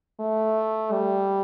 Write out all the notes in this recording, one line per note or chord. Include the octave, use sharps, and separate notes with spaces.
A3
G3